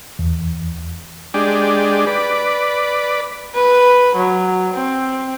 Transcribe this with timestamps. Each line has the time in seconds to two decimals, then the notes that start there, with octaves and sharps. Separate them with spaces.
0.19 E2
1.34 G#3 D4 G4
2.07 B4 D5
3.55 B4
4.16 F#3
4.74 C4